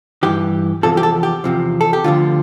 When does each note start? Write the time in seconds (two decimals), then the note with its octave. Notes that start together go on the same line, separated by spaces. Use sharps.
0.23 G2 E3 G4
0.83 E2 C3 F3 A4
0.97 G4
1.03 A4
1.23 G4
1.44 E2 C3 F3
1.81 A4
1.93 G4
2.04 D2 D3 F3 F4